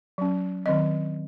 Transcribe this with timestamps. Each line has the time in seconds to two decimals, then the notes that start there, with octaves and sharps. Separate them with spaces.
0.18 F#3 C#4
0.66 D#3 F#3 C4 D#5